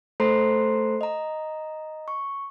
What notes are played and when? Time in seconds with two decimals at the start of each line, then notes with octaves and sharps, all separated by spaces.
0.20 A3 A4 C5 A#5 C6 C7
1.01 D#5 A#5
2.08 C#6